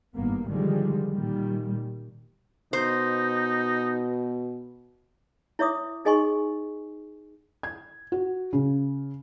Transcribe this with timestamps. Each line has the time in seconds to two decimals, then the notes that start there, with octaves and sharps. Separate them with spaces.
0.15 G#1 G2 A#3 B3
0.49 D3 D#3 F3 G3 G#3
1.10 A#2 D#3 G3
2.73 B2 D#4 C5
5.59 E4 C#5 E5 D6 D#6
6.05 D#4 G#4 D#5 G#5 C6 C#6
7.63 G#6
8.12 F#4
8.53 C#3